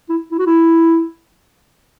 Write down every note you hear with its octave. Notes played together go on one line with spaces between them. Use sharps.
E4
E4
F#4
E4